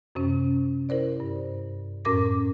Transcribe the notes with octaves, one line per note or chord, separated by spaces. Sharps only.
F#2 C3 C#4
E4 A#4 C5 D5
G2
F#2 A2 C#4 A#4 D6 A#6